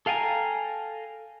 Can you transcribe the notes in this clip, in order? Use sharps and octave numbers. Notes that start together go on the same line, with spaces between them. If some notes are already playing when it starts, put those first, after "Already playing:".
A4 F5 G5 G#5 A#5